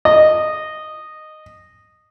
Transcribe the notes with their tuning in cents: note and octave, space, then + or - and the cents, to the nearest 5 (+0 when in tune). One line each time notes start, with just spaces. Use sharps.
D#5 -10